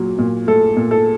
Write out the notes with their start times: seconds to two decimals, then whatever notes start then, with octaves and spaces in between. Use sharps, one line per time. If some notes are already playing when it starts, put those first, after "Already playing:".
Already playing: A#2 F#3
0.18 A#2
0.47 A3 A4
0.76 A#2
0.91 A4